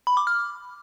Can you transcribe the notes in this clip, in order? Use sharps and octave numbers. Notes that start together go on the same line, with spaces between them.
B5
D6
F6